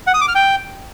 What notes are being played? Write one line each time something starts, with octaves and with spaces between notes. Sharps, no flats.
F#5
D#6
D6
F6
G5